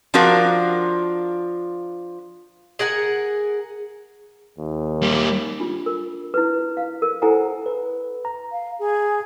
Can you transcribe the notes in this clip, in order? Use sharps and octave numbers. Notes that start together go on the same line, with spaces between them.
F3 D4 F4 F#4 A#4
G#4 A#4 F#5 G#5
D#2
G3 A#3
D4 F4
A#4
E4 B4
F5
A#4
E4 A4 C5 F#5 G#5 A#5
B4
A#5
F5
G#4